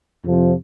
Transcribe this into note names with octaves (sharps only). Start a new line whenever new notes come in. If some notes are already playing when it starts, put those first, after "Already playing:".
F2 C3 F3